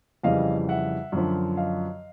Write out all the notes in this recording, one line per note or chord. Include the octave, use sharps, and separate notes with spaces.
F2 C#3 E3 G3 D#5 F5
E5 F#5
F#2 D3 F3
D#5 F5